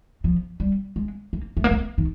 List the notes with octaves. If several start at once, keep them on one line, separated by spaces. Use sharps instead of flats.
F3
G3
G#3
A#3
A3
A#3
A3
D#3